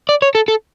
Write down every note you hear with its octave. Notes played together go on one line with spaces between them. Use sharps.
D5
C#5
A4
A4